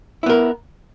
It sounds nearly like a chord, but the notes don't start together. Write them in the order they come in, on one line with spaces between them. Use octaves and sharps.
E4 B3 A#4